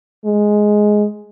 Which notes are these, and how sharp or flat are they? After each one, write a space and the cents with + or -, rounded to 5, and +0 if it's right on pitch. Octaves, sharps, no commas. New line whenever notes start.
G#3 +5